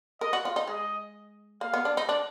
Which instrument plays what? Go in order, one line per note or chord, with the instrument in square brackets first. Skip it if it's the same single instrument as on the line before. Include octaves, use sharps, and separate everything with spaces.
[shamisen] A#4 [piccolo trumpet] D#5
[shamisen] F#4
F4
D#4
[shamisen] G#3 [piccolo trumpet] D#5
[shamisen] A#3 [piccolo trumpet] F5
[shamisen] B3
D4
D#4
D4